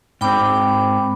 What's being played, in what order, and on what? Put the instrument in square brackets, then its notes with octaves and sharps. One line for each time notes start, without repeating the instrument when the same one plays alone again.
[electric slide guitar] G#2 C4 [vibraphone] G5 B5 D6